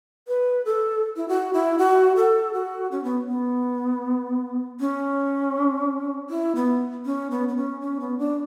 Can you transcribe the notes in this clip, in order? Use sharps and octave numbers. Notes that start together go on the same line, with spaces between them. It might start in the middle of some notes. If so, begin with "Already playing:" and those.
B4
A4
E4
F#4
E4
F#4
A4
F#4
C#4
B3
B3
C#4
E4
B3
C#4
B3
B3
C#4
C#4
B3
D4